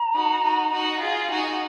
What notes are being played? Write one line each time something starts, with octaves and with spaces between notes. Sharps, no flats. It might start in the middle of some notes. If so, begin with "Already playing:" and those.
Already playing: A#5
D#4 F#4
D#4 F#4
D#4 F#4
F4 G#4
D#4 F#4 G#5